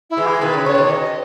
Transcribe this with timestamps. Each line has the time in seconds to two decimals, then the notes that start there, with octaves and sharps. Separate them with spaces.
0.10 E4
0.17 E3 G#3
0.26 G#4
0.41 B2 D#3 B4
0.54 C#3
0.65 C#3 C#5
0.78 B2 D#3
0.90 D#5